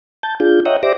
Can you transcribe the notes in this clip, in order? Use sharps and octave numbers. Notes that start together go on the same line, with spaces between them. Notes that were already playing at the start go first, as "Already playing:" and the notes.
A5 G6
D4 F4 G#4 G6
C#5 D#5 E5 F#5 G5 A#5
G4 C5 D5 E5 D6 A#6